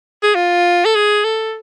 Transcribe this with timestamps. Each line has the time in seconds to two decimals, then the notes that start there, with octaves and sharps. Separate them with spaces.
0.23 G#4
0.35 F4
0.85 A4
0.95 G#4
1.24 A4